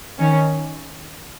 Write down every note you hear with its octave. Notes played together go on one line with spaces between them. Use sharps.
D#3 C#4